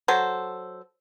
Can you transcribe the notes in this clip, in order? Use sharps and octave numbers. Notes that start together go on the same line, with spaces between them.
F#3 A4 C5